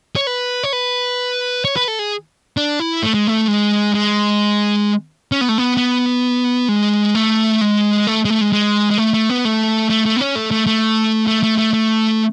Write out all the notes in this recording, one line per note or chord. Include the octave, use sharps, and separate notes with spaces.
C#5
B4
C#5
B4
C#5
B4
A4
G#4
D4
E4
A3
G#3
A3
G#3
G#3
C#4
B3
A3
B3
B3
G#3
A3
G#3
A3
G#3
A3
G#3
G#3
G#3
A3
A3
B3
A3
A3
A3
B3
C#4
A3
A3
A3
A3
A3
A3
A3